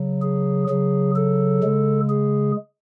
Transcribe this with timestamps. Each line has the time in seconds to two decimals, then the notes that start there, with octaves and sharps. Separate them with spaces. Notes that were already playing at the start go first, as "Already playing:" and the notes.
Already playing: C#3 F#3
0.22 G#4
0.69 C#3 F#3 G#4
1.16 A4
1.63 C#3 G#3
2.10 G#4